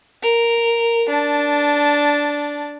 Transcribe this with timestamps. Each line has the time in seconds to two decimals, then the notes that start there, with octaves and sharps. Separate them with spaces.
0.23 A#4
1.09 D4 A5